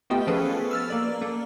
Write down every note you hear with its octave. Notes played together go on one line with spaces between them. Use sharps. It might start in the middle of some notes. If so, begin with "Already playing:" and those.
A3 B3 F4 G4 D#5 G5
F3 B3 C#4 G#4 A4 B4
E6 F6 A6
A#3 D5
A#3 A4